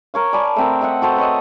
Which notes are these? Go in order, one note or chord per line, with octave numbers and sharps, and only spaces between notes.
A#4 C#5 F5
D5 G#5 A5 B5
A3 C4 A#4
A4 D#5 E5 F#5
F#4 A4 C5
B4 C#5 D#5